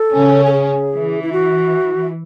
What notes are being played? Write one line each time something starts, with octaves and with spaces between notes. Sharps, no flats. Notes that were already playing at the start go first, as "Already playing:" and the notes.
Already playing: A4
C#3 C#4
A4
G#4
E3
E4
F#4